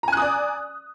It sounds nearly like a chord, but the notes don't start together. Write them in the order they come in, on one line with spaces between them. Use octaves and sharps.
A#5 G#5 F#6 D#6 D5